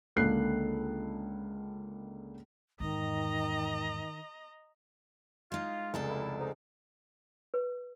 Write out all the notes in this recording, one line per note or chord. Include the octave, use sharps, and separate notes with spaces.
C#2 D3 A#3 A4 F#6 C7
E2 G#2 D#3 D#5 A#5
G#3 D#4 F4
F1 C#2 G#3 G#4 A4 D5
A#3 E4
G#2 D#4
B4